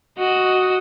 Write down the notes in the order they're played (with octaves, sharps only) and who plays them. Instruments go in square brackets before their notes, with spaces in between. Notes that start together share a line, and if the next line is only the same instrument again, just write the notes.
[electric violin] F#4 D#5